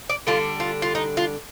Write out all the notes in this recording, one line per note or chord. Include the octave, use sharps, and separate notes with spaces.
D5
D3 G3 D4 F4
F4
F4
D#4
F4